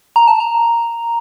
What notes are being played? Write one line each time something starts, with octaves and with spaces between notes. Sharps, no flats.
A#5
A5
A#5